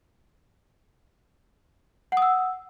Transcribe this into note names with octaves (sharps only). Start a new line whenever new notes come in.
F#5 D#6 E6